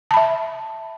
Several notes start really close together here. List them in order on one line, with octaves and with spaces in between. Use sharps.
A5 B5 E5